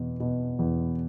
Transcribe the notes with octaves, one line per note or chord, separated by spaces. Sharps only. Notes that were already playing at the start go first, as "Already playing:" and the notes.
Already playing: E2 B2
B2
E2